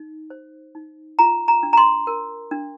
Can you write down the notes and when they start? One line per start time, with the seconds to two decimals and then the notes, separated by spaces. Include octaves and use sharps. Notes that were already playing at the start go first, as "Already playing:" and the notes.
Already playing: D#4
0.30 C5
0.75 D#4
1.19 F4 A#5
1.48 A#5
1.63 D4
1.73 A#5
1.77 C6
2.07 A#4
2.51 D4